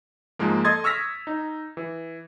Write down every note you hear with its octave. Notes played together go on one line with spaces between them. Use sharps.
G#2 F3 G#3 A#3
A4 D#5 C6 D#6 G#6 A6
C#6 E6 F6 A#6 B6
D#4
E3